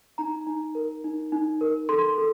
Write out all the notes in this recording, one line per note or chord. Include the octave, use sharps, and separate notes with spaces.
D#4 A#5
D#4
A#4
D#4
D#4
A#4
A4 C6
A4